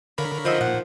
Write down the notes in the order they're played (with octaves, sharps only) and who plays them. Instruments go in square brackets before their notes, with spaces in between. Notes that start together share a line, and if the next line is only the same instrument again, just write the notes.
[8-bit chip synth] D3 A#4 B5 [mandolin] C#5 F5
[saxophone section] D#3 F3 [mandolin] F#4 D#5 E5
[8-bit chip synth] A#2 [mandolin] F#5